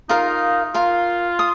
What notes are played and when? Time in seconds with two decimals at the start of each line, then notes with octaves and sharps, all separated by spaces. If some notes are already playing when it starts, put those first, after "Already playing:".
0.09 D#4 F4 A#4 F5
0.74 F4 A#4 F5 C6
1.39 D#6